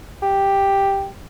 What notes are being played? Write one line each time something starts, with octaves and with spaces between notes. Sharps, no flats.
G4